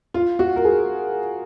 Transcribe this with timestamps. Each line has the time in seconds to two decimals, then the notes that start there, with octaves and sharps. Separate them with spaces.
0.14 F4
0.39 F#4
0.56 A#4
0.65 G#4